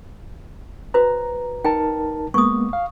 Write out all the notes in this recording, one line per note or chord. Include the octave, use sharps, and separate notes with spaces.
F#4 B4 C5 A#5
D#4 A#4 G5 A5
G#3 A#3 B3 C#6 D#6
F5